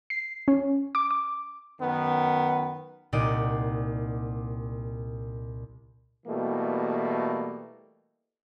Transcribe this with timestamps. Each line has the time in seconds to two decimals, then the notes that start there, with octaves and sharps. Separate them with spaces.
0.10 C7
0.48 C#4
0.95 D6
1.11 D6
1.81 F#2 D#3 B3
3.12 C2 A#2 D#4 D#5 F#5 D6
6.27 B2 E3 G3 A3 A#3